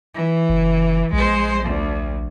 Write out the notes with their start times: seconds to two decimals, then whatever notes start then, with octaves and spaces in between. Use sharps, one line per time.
0.15 E3
0.50 F#1
1.13 A#1 G#3 C5
1.64 D2